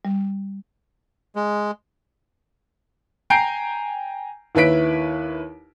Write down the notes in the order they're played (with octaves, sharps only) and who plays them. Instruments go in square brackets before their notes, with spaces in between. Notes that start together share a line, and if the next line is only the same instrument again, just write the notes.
[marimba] G3
[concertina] G#3
[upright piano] G5 G#5 A#5 G6 C7 D7
D#2 E4 B4 C#5 B6 D7